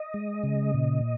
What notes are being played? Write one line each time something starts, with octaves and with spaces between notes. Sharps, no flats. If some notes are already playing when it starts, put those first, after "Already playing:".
Already playing: D#5
G#3
C#3
A#2